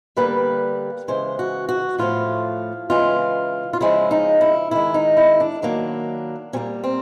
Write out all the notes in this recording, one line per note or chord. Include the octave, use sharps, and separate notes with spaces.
D3 G3 A#3 B4
C#3 E3 G#3 C5
F#4
F#4
A2 F3 A3 F4
C#3 E3 G#3 F4
F4
C#3 F3 G#3 E4
D#4
E4
D#3 G#3 E4
D#4
E4
D4
D#3 F#3 A#3 D4
A#2 G3 A#3 C#4
C4